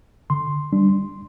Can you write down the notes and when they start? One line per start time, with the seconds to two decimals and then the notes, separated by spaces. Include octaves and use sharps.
0.30 D3 C6
0.72 G3 D4